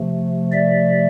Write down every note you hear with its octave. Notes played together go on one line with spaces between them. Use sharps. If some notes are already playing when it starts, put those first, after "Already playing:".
Already playing: C3 F3 A3
D5 E5